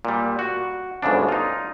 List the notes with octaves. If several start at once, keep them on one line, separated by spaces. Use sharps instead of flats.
A#2 G3
F#4
G1 D2 G#2 C#3 D4
D#4 F4